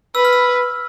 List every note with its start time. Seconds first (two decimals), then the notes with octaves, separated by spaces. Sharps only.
0.15 B4 E6
0.25 F6
0.33 E6